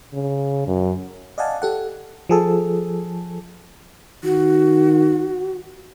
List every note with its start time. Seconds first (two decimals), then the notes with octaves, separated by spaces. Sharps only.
0.13 C#3
0.67 F#2
1.38 D5 D#5 F5 F#5 G#5 A5
1.62 G4 A4 F#5
2.29 F3 G#4 A4
4.24 D#3 F#4